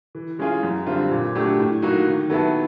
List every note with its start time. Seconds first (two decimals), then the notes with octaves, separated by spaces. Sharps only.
0.15 E3
0.39 G#3 C#4 F4 G#4
0.63 F#2
0.87 D3 G3 C4 F4
1.11 A#2
1.35 F#3 A3 D4 G4
1.59 A2
1.82 F#3 A#3 D#4 F#4
2.07 D#3
2.30 F#3 B3 E4 A4